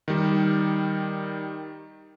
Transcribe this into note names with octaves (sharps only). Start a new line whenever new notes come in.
D#3 G3